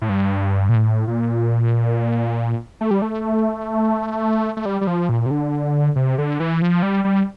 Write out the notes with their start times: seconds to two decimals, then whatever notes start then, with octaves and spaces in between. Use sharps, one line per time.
0.01 A2
0.09 G2
0.69 A#2
0.75 A2
1.08 A#2
2.81 A3
2.91 G3
3.02 A3
4.57 A3
4.66 G3
4.81 G3
4.87 F3
5.09 A#2
5.26 C3
5.31 D3
5.96 C3
6.18 D3
6.40 E3
6.62 F3
6.83 G3
7.04 G3